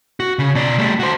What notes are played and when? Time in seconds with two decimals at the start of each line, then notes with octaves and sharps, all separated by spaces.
0.20 F#4
0.39 C#3
0.55 B2 D5
0.78 G3 A3
1.00 F#4 C5